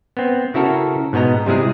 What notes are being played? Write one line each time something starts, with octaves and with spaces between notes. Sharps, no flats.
B3 C4
C#3 E4 F#4 A4 A#4
G#2 B2 B3 D#5 A#5
C3 G3 G#3 E4 G#4